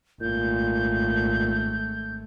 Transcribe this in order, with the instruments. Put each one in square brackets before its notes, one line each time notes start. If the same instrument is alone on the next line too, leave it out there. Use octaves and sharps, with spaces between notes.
[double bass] G#1 A3 [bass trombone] A#2 [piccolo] G6